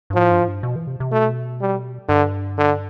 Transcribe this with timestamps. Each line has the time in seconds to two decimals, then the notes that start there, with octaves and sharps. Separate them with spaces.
0.10 G2
0.14 A2 F3
0.31 G2
0.40 A2
0.48 G2
0.63 B2
0.76 E3
0.87 C3
1.00 C3
1.11 B2 A3
1.61 G3
2.08 G2 D3
2.58 D3